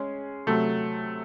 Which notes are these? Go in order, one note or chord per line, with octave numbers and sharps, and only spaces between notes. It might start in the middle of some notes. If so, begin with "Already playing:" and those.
Already playing: G#3 C#4 G#4
C3 F#3 A3